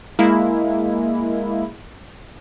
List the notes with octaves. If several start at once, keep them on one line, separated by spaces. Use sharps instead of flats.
G#3 A#3 E4